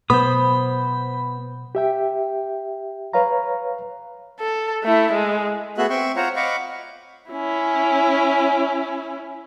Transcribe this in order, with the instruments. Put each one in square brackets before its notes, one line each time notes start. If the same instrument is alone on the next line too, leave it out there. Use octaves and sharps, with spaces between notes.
[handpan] B2 F#3 B4 [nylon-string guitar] B3 [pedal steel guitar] C5 D#6 [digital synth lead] B5
[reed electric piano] G4 E5 G5
B4 C#5 F5 A#5
[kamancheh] A4
A3 E4
G#3
[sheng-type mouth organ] A3 B3 F#4 G#4 E5 F#6
C4 E5 G5 C6 C#6
F4 C5 C#5 F#5 A#5
D#5 F5 F#5 B5 C#6 D6
[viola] C#4 E4